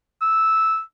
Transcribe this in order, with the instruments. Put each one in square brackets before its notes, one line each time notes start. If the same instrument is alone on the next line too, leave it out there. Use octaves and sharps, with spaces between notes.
[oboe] E6